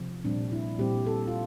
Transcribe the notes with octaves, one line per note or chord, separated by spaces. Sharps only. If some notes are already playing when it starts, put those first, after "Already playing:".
Already playing: C3 F3
A#2 G3 C4 D4
E4
A#2 G3 C4 G4
A4
F4